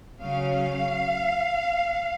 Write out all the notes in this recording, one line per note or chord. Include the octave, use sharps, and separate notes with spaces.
C#3 F#3 C#4 F5